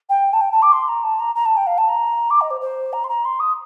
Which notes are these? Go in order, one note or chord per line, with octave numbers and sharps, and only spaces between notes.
G5
A5
G5
A5
D6
C6
A#5
A5
A#5
A#5
A5
G5
F5
A5
A#5
D6
D#5
C5
C5
A#5
C6
A#5
C6
D#6